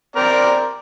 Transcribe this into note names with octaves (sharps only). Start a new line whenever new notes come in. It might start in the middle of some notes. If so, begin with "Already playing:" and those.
C4 A#4 D5